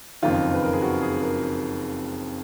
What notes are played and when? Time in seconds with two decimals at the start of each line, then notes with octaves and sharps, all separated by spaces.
0.22 F#1 F2 D#3 F4
0.54 B4
0.64 A#4
0.73 G#4
0.82 F#4
1.02 G#4
1.22 A#4